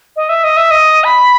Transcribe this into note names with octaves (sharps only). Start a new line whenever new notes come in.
D#5
E5
D#5
E5
D#5
B5